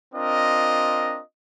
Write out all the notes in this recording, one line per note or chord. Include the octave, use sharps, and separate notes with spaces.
C4 D4 F4 A#4 D#5